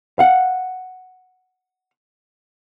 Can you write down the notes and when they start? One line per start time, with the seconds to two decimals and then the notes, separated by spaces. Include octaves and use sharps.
0.19 F5 F#5